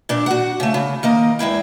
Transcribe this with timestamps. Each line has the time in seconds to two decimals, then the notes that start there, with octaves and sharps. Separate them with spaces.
0.09 A#2 D4
0.26 F#4 F#5
0.60 C#3 A3
0.74 C#3
1.03 D#3 A#3 D#5
1.39 E2 G#3 E4 G5